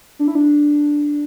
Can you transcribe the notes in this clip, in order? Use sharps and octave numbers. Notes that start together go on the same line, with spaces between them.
D4
E4
D4